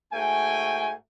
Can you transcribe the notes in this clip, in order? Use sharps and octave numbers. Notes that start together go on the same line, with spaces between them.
G#2 A3 F#4 G5 G#5